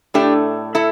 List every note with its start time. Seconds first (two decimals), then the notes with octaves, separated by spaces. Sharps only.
0.14 A2 A3 D4 G4
0.75 E4 A4